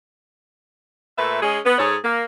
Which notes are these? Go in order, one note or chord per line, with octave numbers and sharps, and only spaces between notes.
A#2 A3 B4 E5
G#3 C#4 G#4
B3
G#2 G#4 A4 C#5
A#3